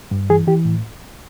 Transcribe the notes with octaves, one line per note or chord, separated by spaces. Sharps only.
G2
E3 G#4
E3 G4
A2